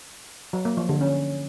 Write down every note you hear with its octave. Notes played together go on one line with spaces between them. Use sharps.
F#3
A#3
F3
D3
C#4